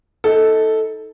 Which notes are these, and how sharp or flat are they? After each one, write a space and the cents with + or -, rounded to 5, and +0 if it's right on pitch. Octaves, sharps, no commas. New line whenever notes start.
D#4 +30 A4 +0